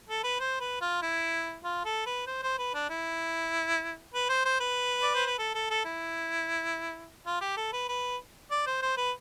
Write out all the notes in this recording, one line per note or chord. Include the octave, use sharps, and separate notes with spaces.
A4
B4
C5
B4
F4
E4
F4
A4
B4
C5
C5
B4
D4
E4
B4
C5
C5
B4
D5
C5
B4
A4
A4
A4
E4
F4
G4
A4
B4
B4
D5
C5
C5
B4